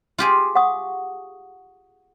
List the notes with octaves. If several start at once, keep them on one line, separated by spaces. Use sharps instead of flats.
F4 G4 G#4
F#5 C#6 D#6